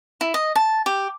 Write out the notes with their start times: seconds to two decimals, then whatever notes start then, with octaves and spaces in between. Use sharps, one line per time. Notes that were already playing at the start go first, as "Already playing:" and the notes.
0.21 E4
0.34 D#5
0.56 A5
0.86 G4